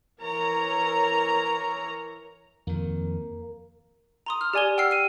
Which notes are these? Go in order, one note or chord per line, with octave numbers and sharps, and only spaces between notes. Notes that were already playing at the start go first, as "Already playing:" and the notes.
E3 A#4 C#5 A#5
F2 D#3 A#3
A#5 C6 D#6
F6
G4 D5 G#5 G#6 G7
F#5 G5 E6 F6 C7
C7 D#7